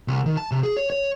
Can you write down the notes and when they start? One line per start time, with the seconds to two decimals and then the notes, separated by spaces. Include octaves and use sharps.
0.08 C2
0.26 D#3
0.37 A5
0.51 C3
0.63 G#4
0.77 C#5
0.90 C#5